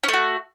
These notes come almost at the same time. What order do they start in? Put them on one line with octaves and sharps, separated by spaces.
C#4 A3 F#4